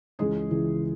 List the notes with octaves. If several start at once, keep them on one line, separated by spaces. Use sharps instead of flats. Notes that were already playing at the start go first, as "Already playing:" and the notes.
C#2 C#3 E3 G#3 G#4
C#2 C#3 E3